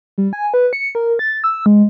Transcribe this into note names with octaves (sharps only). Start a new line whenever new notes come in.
G3
G#5
B4
C#7
A#4
A6
E6
G#3